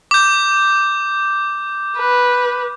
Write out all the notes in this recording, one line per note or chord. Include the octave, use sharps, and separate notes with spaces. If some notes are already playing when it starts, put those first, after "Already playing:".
D6 G6
B4